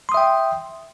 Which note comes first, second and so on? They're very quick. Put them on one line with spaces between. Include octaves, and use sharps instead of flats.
C6 D#6 E5 G5